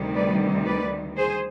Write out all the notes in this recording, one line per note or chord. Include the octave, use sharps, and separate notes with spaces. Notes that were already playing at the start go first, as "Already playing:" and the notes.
Already playing: D2 C3 D#3 G3
B4 D5
B4 D5
G#4 C5